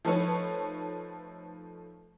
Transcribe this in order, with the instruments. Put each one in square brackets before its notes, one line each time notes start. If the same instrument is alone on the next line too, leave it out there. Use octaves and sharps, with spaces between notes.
[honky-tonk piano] F3 A3 D#4 A4 B4 C#5